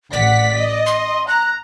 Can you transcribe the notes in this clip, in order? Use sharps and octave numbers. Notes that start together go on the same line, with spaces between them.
A1 D5 F#5 B6
D#5
C6
A#5 F#6